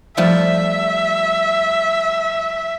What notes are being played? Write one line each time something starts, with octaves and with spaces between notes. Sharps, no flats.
F3 G3 A3 E5